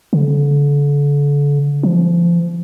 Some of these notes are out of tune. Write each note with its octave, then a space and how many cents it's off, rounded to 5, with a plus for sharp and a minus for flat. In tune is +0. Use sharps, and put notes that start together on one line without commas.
D3 -35
F3 -30